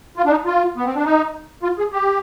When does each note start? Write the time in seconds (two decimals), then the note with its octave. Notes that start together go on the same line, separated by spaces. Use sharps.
0.17 F4
0.26 D4
0.31 D#4
0.45 F4
0.76 B3
0.86 C4
0.95 D4
1.05 D#4
1.63 F4
1.78 G#4
1.92 G4